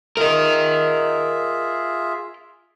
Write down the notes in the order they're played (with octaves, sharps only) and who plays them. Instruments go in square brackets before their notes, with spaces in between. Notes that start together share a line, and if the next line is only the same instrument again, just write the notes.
[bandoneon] F4 G#4 E5 [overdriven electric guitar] A#4 D#5